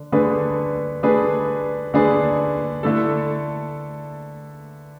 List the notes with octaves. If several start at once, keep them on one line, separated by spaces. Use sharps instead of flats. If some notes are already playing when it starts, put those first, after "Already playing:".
Already playing: D3
D3 A3 D4 G#4 B4
D3 A3 D4 G#4 B4
D3 A3 D4 G#4 B4
D3 A3 E4 A4